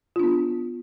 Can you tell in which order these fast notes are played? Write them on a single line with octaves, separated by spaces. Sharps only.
F4 D4 B3